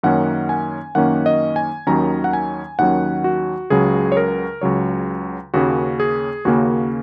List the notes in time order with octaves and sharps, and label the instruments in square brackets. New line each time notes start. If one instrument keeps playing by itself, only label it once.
[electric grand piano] F#2 D#3 A#3 C#4 F#5
G#5
F#2 D#3 A#3 C#4 F#5
D#5
G#5
D#2 D#3 F#3 C#4 A#5
F#5
G#5
D#2 D#3 F#3 C#4 F#5
F#4
C#2 C#3 F#3 G#4
C#5
A#4
C#2 C#3 F#3 C#5
D#2 C#3 A#3 C#4 F#4
G#4
D#2 C#3 A#3 C#4 F#4